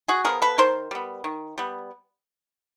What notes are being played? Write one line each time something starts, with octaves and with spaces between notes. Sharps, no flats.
F#4 G#4
F3 G#3 B3 G#4 A#4
A4 B4
D#3 A#4 C5
G3 B3
D#3
G3 B3